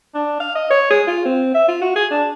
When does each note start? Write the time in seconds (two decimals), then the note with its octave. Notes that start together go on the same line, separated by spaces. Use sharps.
0.15 D4
0.40 F5
0.55 D#5
0.70 C#5
0.90 G#4
1.07 F4
1.26 C4
1.54 E5
1.68 F4
1.81 F#4
1.96 G#4
2.11 D4